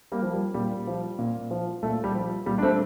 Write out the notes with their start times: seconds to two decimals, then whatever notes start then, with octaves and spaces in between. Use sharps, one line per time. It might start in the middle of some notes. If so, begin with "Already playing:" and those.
0.12 G3 A#3
0.22 F3
0.33 G3
0.54 A#2 G3
0.87 F3
1.19 A#2
1.51 F3
1.83 A#2 A3
2.04 G3
2.15 F3
2.46 A#2 G3
2.58 D4
2.63 A3 C4